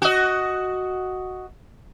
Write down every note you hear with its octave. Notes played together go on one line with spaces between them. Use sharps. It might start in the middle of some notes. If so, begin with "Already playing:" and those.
F#4 D#5